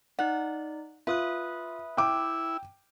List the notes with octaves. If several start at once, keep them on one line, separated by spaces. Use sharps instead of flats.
D#4 D5 F#5
F4 B4 E5 D#6 F#6
E4 G5 D6